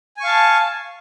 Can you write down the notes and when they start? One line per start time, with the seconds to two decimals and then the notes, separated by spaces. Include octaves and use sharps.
0.17 G#5
0.20 C#6
0.24 F5
0.27 A5